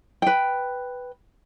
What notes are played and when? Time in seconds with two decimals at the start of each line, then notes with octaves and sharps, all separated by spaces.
0.22 B4 G5